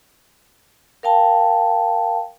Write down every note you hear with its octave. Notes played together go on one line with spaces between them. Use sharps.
A#4 F5 G5 A5